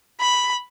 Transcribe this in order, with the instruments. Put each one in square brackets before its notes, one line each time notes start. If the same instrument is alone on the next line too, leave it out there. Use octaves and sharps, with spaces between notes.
[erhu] B5